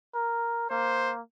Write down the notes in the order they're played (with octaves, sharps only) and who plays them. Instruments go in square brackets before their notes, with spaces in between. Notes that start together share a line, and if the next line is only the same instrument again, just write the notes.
[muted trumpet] A#4
[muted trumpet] A#3 [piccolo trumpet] C5